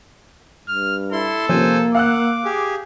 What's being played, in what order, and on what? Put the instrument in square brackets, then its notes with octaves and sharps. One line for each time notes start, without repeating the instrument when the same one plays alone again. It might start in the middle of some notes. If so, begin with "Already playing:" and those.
[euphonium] G2 [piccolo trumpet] F6
[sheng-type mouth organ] E4 C6 [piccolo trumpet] A4
[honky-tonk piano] C3 F3 C#4 [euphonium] A#3 [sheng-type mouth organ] C5 G#5
[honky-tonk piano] F5 E6 F#6 [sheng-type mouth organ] F#5 [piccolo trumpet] D6
[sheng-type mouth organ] G4 G#4